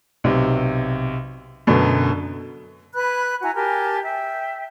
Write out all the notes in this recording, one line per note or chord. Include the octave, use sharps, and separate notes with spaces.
B1 C3
F#2 B2 D3 F#3
B4 B5 F#6 G#6
E4 F#4 G#5 A#5
G4 A#4 G#5 A5
E5 G5